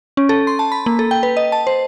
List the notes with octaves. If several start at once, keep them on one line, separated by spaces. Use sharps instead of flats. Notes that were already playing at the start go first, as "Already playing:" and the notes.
C#4
A4
C6
A5
B5
A#3
A4
G5
B4
D#5
A5
C5